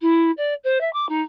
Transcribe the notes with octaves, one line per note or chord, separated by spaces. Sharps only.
E4
D5
C5
E5
D6
D#4